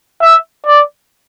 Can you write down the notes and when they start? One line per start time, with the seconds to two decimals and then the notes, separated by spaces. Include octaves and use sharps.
0.21 E5
0.66 D5